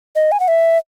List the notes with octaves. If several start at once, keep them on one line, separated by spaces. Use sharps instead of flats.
D#5
G#5
F#5
E5